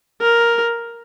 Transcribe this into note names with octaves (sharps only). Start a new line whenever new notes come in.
A#4